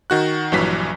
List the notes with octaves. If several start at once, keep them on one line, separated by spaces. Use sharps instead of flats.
D#3 F#4 F#6
A#1 G2 E3 F#3 B6